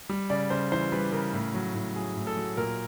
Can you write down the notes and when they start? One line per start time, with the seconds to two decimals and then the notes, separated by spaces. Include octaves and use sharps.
0.09 G3
0.30 C#3 D5
0.50 C#3 C5
0.72 E3 C5
0.92 G3 B4
1.12 C#3 A#4
1.33 A2
1.54 F#3
1.74 A2
1.95 F#3 G#4
2.17 A2
2.27 A4
2.37 F#3
2.57 A#2 A#4